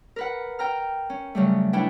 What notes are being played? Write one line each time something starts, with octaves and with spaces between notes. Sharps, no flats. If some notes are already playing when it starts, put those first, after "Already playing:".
A#4 B4 F#5
G5 A#5 F6
C#4
C#3 F#3 G3 A3
C#4 D4 E4 B4 G5